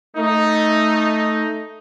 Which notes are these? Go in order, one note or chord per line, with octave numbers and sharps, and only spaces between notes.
A3 D#4